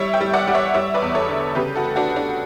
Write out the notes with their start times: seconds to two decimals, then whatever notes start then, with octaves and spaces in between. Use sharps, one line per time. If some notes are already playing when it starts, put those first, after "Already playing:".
Already playing: G3 C#5 E5
0.14 E5 G5
0.21 G3
0.34 D5 F#5
0.47 G3
0.54 C#5 E5
0.74 G3 C#5 E5
0.94 B4 D5
1.02 E2
1.15 A4 C#5
1.28 D3
1.55 C#3 G4 B4
1.75 F#4 A4
1.83 A3
1.96 D4 F#4
2.10 A3
2.16 D4